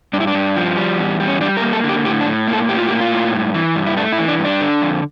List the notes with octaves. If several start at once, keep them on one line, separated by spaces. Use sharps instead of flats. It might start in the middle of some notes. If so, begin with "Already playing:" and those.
G2 D4
E4
D4
G2
F3
G3
E2
G3
C#4
G3 D4
A#4
A#3
A4
D3
G4
A2 G4
D4
A2
A#3
A4
A2 G4
F4
G4
A#3
F4
A2
G2
E3
G2
E4
A3 D4
E4
E3
D4
G2
D4
D3
F2